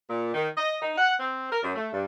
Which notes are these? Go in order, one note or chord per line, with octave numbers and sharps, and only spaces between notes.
A#2
D#3
D#5
D#4
F#5
C4
A#4
F#2
A3
G2